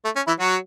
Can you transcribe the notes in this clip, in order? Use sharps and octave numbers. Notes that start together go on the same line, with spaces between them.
A3
C#4
E3 E4
F#3 F#4